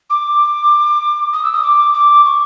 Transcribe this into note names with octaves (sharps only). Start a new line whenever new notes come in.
D6
D#6
E6
D#6
D6
D6
C#6